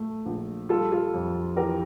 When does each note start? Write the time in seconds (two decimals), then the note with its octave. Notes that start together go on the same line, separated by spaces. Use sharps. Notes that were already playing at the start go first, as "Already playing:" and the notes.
Already playing: A#2 A3
0.26 A#1
0.69 G3 F4 A4
0.92 F4 A4
1.14 F2
1.56 E3 G4 A#4